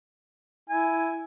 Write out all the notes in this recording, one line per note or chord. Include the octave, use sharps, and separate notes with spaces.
E4 G#5